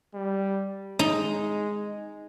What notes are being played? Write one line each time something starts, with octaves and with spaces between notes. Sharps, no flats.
G3
G#3 D#4